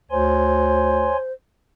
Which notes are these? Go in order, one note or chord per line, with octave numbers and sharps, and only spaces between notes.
D2 C5 C#5 G#5 C6